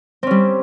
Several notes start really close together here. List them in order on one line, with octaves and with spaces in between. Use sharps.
C4 C#4 G3